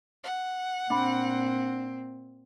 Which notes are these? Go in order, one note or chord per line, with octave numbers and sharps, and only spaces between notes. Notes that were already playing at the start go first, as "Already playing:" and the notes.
F#5
A#2 C4 D4 B5